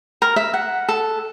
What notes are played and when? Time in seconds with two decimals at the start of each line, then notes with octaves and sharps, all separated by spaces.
0.22 A#4
0.36 E5
0.54 F#5
0.89 A4